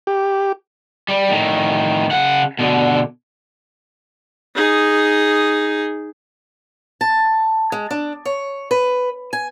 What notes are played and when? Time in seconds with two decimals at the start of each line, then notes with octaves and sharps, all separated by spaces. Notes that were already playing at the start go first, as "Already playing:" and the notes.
0.07 G4
1.08 G3
1.30 A2 D#3
2.11 C#3 F#5
2.59 B2 D3
4.55 D#4 G#4
7.01 A5
7.72 G#3
7.91 D4
8.25 C#5
8.71 B4
9.33 G#5